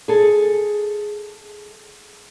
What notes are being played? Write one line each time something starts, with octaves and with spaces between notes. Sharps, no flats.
G#4 A4